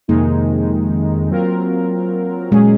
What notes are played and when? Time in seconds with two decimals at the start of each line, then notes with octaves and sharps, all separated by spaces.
0.08 F2 C3 D#3 G#3 A#3 D#4
1.30 F#3 C4 F4 A#4
2.51 A#2 F#3 G#3 C#4 G#4